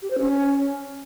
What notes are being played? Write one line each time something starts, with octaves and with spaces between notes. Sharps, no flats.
G4
C5
C#4